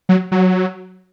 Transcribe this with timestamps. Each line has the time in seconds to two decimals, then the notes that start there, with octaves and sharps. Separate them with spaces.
0.09 F#3
0.32 F#3